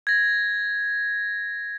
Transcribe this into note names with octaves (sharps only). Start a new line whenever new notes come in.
G#6 A#6